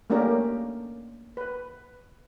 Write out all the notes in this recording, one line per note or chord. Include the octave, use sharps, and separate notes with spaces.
A3 A#3 C#4 D4 G4 A#4
B4